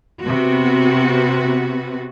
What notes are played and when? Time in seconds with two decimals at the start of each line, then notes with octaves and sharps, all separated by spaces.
0.21 C3 B3 F#4